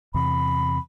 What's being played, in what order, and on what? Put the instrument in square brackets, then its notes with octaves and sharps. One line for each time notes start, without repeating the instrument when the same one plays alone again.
[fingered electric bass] E2 C3 [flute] B5